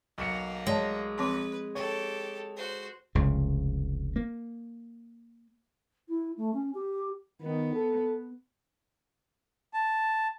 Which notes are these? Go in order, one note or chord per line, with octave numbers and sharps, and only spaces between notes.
B1 A#3 C#7
G#3 C#5 D5 A5
F3 C4 B4 C6
G4 A4 C#5
F#4 C5
F1 C#2 C#3
A#3
E4
A3
C#4
G4
D#3 B3
A4
A5